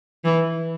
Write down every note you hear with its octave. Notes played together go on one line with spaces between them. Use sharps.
E3